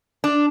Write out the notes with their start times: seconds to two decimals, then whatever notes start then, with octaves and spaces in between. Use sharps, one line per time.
0.24 D4